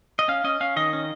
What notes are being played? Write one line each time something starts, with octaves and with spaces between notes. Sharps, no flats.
D#5
C#4 F5
C#4 D#5
C#4 F5
D#3 D#5
C#4